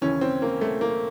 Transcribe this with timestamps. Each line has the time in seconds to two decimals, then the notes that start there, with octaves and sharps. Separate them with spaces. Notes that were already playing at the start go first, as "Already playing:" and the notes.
0.01 D#2 C#3 E3 C#4
0.21 C4
0.42 A#3
0.61 A3
0.81 A#3